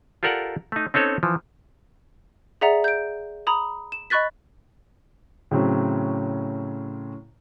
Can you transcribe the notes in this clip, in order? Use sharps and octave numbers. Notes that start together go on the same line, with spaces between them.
F4 G4 A4 A#4 D5 F#5
A3 D#4
C4 C#4 D#4 A4 C#5
E3 F3
G#4 D5 E5 F#5 A#5
G6 D7
A#5 B5 D#6
E7
D#5 B5 C#6 F#6 A6 B6
A2 C#3 F#3 C4 C#4